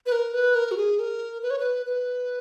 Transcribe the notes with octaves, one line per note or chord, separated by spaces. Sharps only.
B4
A#4
B4
A#4
F#4
G#4
A#4
B4
C#5
B4
B4